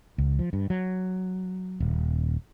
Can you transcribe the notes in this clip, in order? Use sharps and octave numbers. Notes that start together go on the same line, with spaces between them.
C#2
F3
G2
F#3
D#1